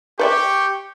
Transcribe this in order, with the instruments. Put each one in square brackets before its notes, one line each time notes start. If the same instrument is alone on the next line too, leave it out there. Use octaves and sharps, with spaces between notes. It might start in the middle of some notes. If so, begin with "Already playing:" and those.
[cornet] G4 [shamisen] B4 D5 E5 [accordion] C#6 G6